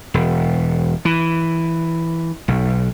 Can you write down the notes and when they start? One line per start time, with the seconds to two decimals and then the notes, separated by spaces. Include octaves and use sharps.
0.14 E1
1.05 E3
2.48 B1